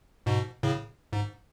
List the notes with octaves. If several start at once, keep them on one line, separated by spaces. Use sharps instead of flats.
G#2 B2
A2 C#3
G#2